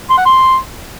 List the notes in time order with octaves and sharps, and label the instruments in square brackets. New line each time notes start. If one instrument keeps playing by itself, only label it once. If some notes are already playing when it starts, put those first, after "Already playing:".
[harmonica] C6
F#5
C6